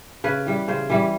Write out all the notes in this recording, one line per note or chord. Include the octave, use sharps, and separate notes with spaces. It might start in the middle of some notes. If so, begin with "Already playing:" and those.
C#3 B4
E3 G3
C#3 C5
E3 G3